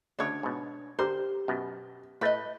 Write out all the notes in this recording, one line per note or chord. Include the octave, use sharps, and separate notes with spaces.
D2 C#3 D4 C#5
G#2 B2
D3 G4 A#4 C5
F#2 B2
A2 A3 B4 D#5